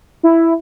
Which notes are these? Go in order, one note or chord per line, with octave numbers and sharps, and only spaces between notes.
E4